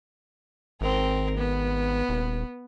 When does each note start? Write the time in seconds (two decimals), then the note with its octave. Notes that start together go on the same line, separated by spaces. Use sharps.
0.81 G#1 C4 A#4
1.38 B3
2.09 D#1